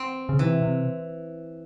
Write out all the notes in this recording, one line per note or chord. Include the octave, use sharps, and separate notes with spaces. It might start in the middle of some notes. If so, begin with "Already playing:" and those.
Already playing: C4
C#3
C3 E3
C3